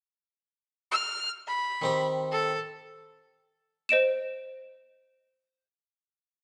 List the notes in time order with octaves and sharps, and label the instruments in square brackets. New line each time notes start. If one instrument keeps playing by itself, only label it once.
[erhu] F6
B5
[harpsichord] D#3 C4 G4
[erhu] A4
[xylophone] C5 D#5 D7 E7